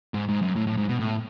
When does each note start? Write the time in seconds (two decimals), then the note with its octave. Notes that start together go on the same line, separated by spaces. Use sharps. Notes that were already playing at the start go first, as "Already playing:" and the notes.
0.14 G#2
0.29 G#2
0.42 F#2
0.56 A2
0.67 A2
0.77 G#2
0.88 B2
0.99 A2